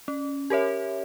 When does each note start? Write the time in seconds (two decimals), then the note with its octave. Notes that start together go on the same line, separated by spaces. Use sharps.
0.08 C#4
0.50 G4 A#4 C#5 E5